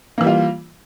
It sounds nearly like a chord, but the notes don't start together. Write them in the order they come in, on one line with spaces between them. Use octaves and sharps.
A#3 E3 G3 F4